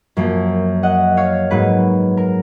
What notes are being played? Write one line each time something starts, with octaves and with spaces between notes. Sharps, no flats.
F#2 F3 A#3
D#5 F#5
C#5 F5
G#2 F#3 A#3 B4
A#4